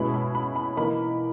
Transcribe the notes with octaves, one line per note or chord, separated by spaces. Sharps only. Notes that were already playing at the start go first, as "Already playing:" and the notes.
Already playing: B2 G#3 C#4 E4 B5
B5
B5
B5
E3 A#3 D#4 B5